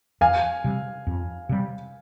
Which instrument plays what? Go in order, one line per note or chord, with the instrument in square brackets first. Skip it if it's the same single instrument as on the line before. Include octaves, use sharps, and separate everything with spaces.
[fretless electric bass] F2 [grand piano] F5 G#5
[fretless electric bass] C3 G3
F2
C3 G3